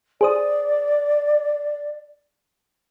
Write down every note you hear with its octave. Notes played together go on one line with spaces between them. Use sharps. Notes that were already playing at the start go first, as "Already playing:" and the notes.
G#4 C5 D5 D#6